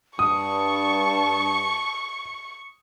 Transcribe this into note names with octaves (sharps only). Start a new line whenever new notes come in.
G2 A5 C#6 D#6